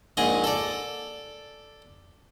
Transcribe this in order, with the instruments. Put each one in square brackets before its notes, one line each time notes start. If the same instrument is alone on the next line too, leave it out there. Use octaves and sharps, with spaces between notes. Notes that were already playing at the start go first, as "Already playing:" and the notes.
[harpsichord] A#1 G#2 G#4 D#5
A4 D5